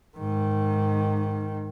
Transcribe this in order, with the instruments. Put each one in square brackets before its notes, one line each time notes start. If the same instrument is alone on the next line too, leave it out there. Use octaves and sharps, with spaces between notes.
[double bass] G#2 D#3